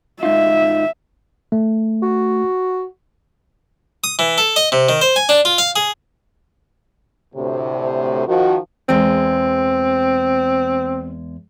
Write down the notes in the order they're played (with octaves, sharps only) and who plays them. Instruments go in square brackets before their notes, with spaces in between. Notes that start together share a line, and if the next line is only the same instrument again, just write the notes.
[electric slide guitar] G#2 D#4 F4 [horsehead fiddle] E5
[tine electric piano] A3
[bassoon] F#4
[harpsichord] D#6
E3
A4
D#5
C3
D#3
C5
G#5
D4
F4
F5
G#4
[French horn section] D2 A2 C3
D#3 F3 F#4
[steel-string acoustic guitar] E2 G#3 [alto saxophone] C4